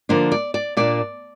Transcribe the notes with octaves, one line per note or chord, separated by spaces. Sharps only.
D3 F3 A#3 D4 C5
D5
D5
A#2 A#3 D4 D5